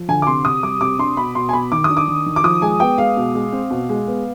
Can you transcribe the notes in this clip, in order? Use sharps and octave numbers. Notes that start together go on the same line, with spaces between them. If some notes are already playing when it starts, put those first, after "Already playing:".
Already playing: F3
D3 G#5
D6
C3 C6
C3 D#6
G3 D6
C3 D6
D4 C6
B2 B5
B2 C6
G#5
B2 B5
D#3 D6
D4 D#6
D6
D#3
D#3
D6
F3 D#6
G#3 G#5
B3 G5
G#3 F5
B2
G#3
C4
B2
G#3
B3